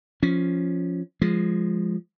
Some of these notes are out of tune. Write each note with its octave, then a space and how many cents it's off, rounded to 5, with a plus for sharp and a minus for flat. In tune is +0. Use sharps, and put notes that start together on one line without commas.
F3 +0 C#4 +0
F3 +0 G#3 -5